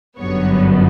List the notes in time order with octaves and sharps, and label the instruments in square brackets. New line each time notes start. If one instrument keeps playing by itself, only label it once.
[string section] G1 F#2 D3 G3 B3 C#5